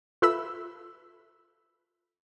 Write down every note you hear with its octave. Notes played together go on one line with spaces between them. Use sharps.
F4 A4 B4 E5 B5 E6